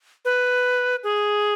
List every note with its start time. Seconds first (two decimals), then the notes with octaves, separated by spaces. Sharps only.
0.25 B4
1.03 G#4